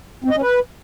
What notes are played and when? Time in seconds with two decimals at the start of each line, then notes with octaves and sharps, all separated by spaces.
0.24 C4
0.30 D#5
0.36 C#4
0.42 B4